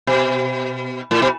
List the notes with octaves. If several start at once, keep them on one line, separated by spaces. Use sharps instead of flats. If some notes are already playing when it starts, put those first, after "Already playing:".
B2
A2
B2